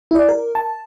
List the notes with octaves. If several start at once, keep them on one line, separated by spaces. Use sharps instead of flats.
E4 D5
A#4
A5